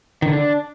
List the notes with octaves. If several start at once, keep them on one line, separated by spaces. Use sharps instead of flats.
D#3
D3
D4